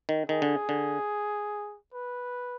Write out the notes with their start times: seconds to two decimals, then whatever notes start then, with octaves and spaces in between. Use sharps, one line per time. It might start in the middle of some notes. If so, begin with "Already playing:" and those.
0.09 D#3
0.29 D#3 G#4
0.42 D3
0.69 D3
1.94 B4